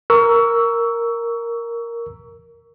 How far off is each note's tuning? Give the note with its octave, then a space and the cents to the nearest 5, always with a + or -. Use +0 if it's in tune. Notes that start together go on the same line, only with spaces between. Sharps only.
A#4 +0 C#6 +30 E6 +0